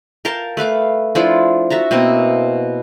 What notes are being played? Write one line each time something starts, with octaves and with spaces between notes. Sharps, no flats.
A#4 F5 G5 A5
A3 B4 F5 D6
F3 D4 E4 F4
F#4 E5 A5 A#5
B2 A#3 C4 E4